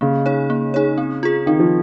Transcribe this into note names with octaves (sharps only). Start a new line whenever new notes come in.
C#3 A#3
D#4 G#4 C#5
A#3
D#4 G#4 C#5
C4
F4 G#4
D#3 C4
F3